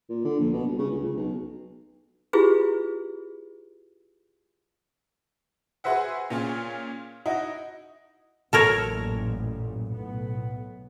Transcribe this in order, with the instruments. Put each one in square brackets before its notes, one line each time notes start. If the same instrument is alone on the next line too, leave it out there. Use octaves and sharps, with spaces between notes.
[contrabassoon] A#2
D3
A#1
B2
G1
C#3
C#2
C#3
B1
[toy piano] E4 F4 G4 G#4 B4
[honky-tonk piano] F#4 G#4 B4 C5 E5 F#5
A#2 C#4 F4 G#4
D#4 E4 F#4 D#5
[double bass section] A1 F#2 A#2 [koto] A4 A#4 C#5
[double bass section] B1 A2 B3